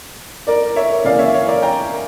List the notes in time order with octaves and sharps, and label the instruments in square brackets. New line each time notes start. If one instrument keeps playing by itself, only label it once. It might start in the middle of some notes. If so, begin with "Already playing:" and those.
[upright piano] A#4 D5
C#5 E5
C#3 E3 A#3 D5 F5
C#5 E5
C#5
A#4 D5
G5 A#5